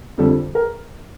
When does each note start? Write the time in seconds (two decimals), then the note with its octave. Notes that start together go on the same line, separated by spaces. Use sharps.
0.18 F2 D3 G3 A4
0.55 A#4